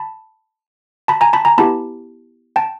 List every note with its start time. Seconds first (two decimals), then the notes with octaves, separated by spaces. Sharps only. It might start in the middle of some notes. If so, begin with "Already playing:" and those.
Already playing: A5 B5
1.08 A5 B5
1.21 G#5 A#5
1.33 A5 B5
1.45 G#5 A#5
1.58 B3 E4 G4 A5 B5
2.56 G5 A5